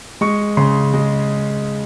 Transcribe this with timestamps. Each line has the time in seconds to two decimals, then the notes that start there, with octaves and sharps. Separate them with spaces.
0.21 G#3 C#6
0.57 C#3 C6
0.94 G#3